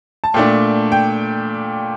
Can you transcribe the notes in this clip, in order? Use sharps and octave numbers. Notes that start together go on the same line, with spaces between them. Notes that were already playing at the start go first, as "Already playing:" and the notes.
A5
A#2 A3 D4 G5
G5